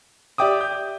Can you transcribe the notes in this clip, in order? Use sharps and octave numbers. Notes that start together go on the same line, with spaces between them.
G4 D5 E5 G5 D6 D#6
G6